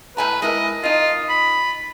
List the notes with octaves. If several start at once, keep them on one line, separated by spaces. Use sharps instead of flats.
A2 B4 G#5 A#5
G#3 E4 A#4 D#5
D#4 F4 D#5
B5